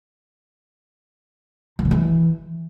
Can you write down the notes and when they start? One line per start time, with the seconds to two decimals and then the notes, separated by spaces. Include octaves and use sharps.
1.79 D#3
1.85 D3
1.91 E3